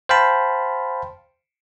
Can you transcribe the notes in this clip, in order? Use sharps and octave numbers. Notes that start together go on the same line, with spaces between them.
C5 F5 G5 A5 B5